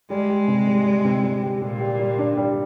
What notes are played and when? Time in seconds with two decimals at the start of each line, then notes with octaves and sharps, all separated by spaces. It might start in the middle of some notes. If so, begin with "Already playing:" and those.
0.10 G3 G#3
0.30 G4
0.48 C3
0.67 G3
0.86 G3
1.04 C3
1.24 G3
1.43 G4
1.61 A#2 G3
1.80 G4
1.99 G3
2.19 D4
2.37 G3